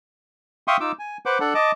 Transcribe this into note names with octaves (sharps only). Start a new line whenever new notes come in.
E5 F5 G5 C6 C#6 D#6
D#4 F4 D6 E6
G#5
B4 C5 F#5 D6
D4 A4 F#5
D#5 A5 D6